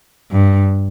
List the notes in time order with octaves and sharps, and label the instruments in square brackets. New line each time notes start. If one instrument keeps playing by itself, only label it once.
[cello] G2